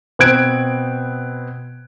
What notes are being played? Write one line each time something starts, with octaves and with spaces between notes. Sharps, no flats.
B2 B3 C4 F#6 G#6 D7